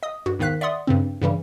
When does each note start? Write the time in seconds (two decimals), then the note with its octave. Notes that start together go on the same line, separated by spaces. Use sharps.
0.03 D#5 D#6
0.26 G2 F#4
0.39 E2 G#2 D#3 F5 F#6 B6
0.61 D5 E5 F#5 C6 D#6
0.87 G2 C#3 C4
1.22 G2 C#3 E3 G3